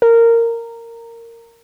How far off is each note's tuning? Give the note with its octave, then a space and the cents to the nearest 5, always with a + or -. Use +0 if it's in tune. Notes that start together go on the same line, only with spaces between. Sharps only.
A#4 -15